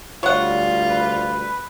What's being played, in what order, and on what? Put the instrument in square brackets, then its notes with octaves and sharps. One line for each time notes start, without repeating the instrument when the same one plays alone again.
[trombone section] D2 G3 [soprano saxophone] F4 [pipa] C#5 F#5
[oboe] B4